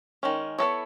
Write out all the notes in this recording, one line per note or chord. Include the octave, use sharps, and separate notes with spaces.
D#3 G#3 C#4
B3 E4 A4 C#5